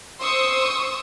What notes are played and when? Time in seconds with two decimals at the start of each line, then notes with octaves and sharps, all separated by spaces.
0.20 C5 C6 C#6 D#6 E6